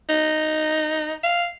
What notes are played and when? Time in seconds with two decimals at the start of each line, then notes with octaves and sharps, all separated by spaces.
0.09 D#4
1.23 F5